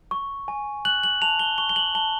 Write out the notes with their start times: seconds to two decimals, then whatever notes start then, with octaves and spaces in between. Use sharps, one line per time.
0.11 C#6
0.48 G#5
0.85 F#6 F#7
1.04 F#7
1.22 A5 F7
1.39 G7
1.58 C#6 G7
1.69 G7
1.76 F#7
1.95 A5 G7